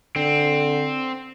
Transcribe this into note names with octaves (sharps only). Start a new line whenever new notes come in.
D3 C4